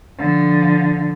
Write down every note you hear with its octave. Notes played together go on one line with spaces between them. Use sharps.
D3 F3